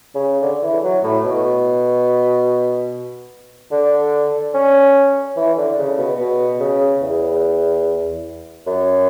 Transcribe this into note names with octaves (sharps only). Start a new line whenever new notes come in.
C#3
D3
E3
F#3
A2
B2
D3
C#4
E3
D3
C#3
B2
B2
C#3
E2
F#2